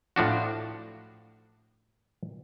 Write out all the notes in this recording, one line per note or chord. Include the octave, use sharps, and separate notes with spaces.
A2 F3 D4 F#4